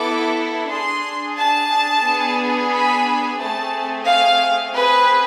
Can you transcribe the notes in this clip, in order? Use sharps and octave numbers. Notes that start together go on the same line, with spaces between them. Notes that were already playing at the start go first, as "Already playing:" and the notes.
Already playing: B3 E4 A4 D6
D4 G#4 C6
A5
B3 D4 G#4
B5
A3 C4 G#4 A5
F5
C4 G#4 B4